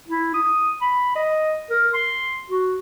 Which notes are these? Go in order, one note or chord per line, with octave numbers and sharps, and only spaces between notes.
E4
D#6
B5
D#5
A#4
C6
F#4